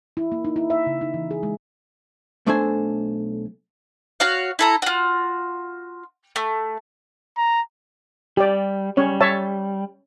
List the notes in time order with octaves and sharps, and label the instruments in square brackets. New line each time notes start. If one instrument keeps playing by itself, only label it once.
[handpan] E4
A#3
D#4
E4
E5
C#3
D#4
E3
G#4
G#3
[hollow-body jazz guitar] B1 A3 D4 A4 C5 G#5
[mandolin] F#4 C#5 F5
E4 A4 A#5
F4 F#4
A3
[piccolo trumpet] A#5
[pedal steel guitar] G3 [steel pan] G4 D5
[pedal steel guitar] G3 [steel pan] C#4 C#5
[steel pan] C#5 E5 A5